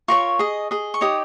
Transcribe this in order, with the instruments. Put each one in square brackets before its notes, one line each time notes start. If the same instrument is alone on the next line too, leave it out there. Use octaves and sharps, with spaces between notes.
[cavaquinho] F4 A#4 C#5 C#6
G#4 D#5
G#4 D#5
C#6
D#4 G4 C#5 D#6